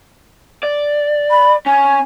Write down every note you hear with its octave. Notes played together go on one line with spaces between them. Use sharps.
D5
B5
C#4 G#5